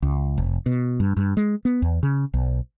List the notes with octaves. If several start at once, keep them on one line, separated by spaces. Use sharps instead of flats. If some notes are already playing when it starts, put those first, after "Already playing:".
C#2
F1
B2
G2
G2
G#3
B3
E2
C#3
B1